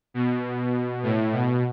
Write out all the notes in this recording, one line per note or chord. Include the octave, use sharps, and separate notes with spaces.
B2
A2
B2